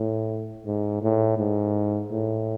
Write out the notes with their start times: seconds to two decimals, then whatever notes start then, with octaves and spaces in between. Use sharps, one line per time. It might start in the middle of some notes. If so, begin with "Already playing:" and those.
Already playing: A2
0.66 G#2
1.02 A2
1.39 G#2
2.12 A2